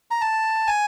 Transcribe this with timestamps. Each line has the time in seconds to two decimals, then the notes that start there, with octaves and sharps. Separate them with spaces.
0.11 A#5
0.21 A5
0.67 G#5